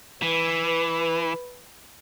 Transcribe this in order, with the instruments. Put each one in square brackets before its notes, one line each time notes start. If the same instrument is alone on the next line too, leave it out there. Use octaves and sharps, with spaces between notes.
[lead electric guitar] E3 [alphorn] B4